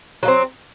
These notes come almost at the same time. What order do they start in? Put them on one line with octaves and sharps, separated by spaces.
F#3 A#3 C4